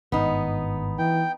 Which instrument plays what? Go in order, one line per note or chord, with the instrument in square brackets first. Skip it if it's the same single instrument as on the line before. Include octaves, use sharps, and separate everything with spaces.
[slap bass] G#1 G2 [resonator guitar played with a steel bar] B3 D#4
[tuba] E3 [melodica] G5